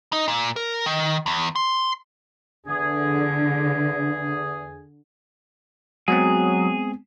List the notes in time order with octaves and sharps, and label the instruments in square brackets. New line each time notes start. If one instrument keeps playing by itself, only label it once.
[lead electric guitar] D#4
A#2
A#4
D#3
E2
C6
[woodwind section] E2 G#4 [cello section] D3
[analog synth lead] F#3 [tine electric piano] G#3 B3 C4 [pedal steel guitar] G#4